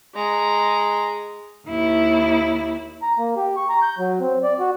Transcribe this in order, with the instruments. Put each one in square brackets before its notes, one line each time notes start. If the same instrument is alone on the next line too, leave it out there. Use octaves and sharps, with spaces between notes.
[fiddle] G#3 A#5
[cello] D#2 E4
[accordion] A#5
A#3
G4
C#6
A#5
G6
F#3
C4
D5
F#4